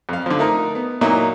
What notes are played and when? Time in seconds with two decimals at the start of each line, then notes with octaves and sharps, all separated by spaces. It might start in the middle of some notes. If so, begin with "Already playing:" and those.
0.09 F2 F5
0.26 D3 F3
0.39 A3 D#4 A#4
0.75 B3
1.01 A#2 F#3 A#3 D#4 E4